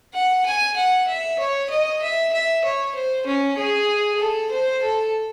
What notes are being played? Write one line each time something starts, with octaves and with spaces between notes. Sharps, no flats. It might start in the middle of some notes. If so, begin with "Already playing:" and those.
F#5
G#5
F#5
E5
C#5
D#5
E5
E5
C#5
C5
C#4
G#4
A4
C5
A4